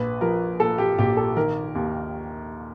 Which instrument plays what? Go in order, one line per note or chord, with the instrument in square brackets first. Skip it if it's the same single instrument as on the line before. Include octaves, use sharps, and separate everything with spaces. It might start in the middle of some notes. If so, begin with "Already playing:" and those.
Already playing: [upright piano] A#1 B4
F3 A#4
A#2 A4
G4
A#1 G4
A4
D#3 A#4
D#2